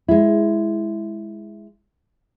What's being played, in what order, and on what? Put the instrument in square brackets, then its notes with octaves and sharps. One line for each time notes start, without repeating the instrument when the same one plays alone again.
[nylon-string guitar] G#3 E4